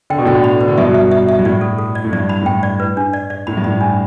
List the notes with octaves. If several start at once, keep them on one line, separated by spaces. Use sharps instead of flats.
D3 G5
B2
A2 D3 G5
B5
B4
D3
G2 B2 E5
E5
E5
E5
G2
A2 D5
A4
A4
D5
A2
G2 D5
B5
A2
G2 G5
D5
B4
D4
D5
D5
A2 B5
G2
A2 B5
D4